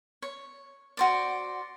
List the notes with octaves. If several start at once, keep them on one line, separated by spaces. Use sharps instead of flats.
C#5
F#4 C5 D5